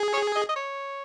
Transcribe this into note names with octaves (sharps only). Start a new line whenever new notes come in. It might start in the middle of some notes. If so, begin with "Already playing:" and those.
Already playing: G#4
C#5
D#5
D#5
C#5